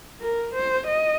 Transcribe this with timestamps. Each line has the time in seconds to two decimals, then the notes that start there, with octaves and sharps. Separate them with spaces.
0.21 A#4
0.54 C5
0.87 D#5